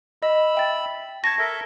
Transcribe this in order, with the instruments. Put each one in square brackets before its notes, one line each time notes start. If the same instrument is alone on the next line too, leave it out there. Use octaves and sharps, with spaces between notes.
[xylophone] D#5 [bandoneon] B5 E6
[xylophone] E5 G5 A6
[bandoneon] A5 C#6 [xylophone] G#6 A#6
[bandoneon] A4 A#4 E5